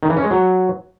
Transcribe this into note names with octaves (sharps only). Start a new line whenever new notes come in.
D#3
E3
C#4
G#3
F#3